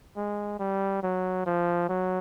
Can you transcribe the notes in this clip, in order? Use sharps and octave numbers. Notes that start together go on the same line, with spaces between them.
G#3
G3
F#3
F3
F#3